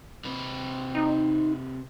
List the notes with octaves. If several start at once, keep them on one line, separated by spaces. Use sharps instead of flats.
C3 C4 B4
D#4